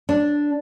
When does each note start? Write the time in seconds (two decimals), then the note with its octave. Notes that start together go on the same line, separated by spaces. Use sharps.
0.09 D4